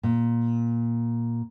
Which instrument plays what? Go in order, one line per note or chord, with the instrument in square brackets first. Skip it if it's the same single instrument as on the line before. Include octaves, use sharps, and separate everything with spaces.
[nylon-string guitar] A#2